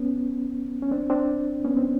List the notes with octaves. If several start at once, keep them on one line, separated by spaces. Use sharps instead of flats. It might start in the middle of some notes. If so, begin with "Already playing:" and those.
Already playing: B3 C#4
C#4
C4 D4
C4 D4
B3 C#4
C4 D4